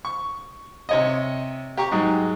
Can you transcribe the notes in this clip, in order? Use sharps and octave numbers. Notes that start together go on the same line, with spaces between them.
C#6
C3 C#5 D#5
G4 A#5 C#6
G#2 F#3 G#3